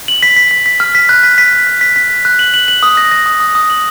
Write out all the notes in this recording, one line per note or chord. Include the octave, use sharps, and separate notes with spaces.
F#7
B6
B6
B6
B6
F6
B6
F#6
B6
B6
B6
B6
B6
B6
B6
F#6
F#7
F#7
F#7
D#6
A#6
A#6
D#6
D#6
D#6
F#7